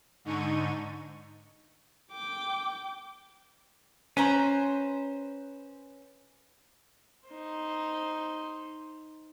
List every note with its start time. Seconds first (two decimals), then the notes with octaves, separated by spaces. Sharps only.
0.25 G#2 D3 D#4 C#6 D#7
2.13 G5 D6
4.17 C#4 B4 C5 A#5
7.28 D#4 C5